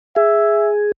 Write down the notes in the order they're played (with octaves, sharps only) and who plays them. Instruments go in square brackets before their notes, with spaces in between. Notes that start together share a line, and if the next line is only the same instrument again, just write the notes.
[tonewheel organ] G#4 [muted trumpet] E5